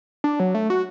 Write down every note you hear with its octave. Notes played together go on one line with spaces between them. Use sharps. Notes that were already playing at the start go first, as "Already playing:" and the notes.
D4
F#3
A3
F#4